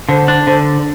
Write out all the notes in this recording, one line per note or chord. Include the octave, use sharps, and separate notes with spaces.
D3 C5
D4
D3 C5